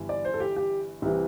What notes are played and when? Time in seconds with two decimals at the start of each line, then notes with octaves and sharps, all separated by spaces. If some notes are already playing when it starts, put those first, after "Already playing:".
Already playing: G1 G2 E3
0.09 D5
0.25 C5
0.34 A4
0.40 G4
0.56 G4
1.02 C2 C3 E3